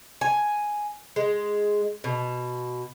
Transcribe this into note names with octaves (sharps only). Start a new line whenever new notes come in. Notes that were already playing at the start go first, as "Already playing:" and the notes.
G#5
G#3
B2